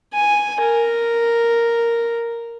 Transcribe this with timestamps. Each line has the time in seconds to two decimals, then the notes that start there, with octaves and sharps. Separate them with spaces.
0.14 G#5
0.61 A#4